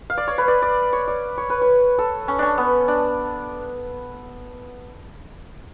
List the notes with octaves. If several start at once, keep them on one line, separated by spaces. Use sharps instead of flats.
F5
D5
C#5
B4
D5
D5
C#5
D5
C#5
B4
C#5
A4
C#4
C#4 D4
B3
D4